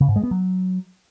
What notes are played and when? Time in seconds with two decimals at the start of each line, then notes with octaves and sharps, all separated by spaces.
0.01 C#3
0.08 G#2
0.16 G#3
0.24 B3
0.31 F#3